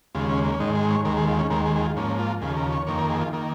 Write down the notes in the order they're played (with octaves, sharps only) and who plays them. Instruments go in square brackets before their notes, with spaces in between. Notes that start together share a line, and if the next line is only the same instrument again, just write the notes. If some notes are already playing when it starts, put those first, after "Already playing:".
[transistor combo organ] D#2 C#3 G#3 F4
C#4
A#3
C#4
G#2 D#3 G#3 D#4
G#4
C#5
D#2 D#3 G#3 A#4
G#4
F4
C#4
D#2 D#3 G#3 A#4
G#4
G#4
F4
G#2 F3 A#3 C#4
F4
D#2 C#3 F3 G#4
A#4
C#5
F2 D#3 A#3 C#5
A#4
G#4
F4
D#3 A#3